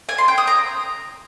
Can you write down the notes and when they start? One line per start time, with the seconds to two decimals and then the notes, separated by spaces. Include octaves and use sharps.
0.09 G#5
0.18 C6
0.28 G5
0.38 D#6
0.47 A#5